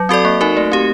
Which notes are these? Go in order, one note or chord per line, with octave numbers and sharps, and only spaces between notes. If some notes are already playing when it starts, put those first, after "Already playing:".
Already playing: F#3
C4 F#4 A4 D5
A#3
D#4 F#4 A#4
A3
C4 G4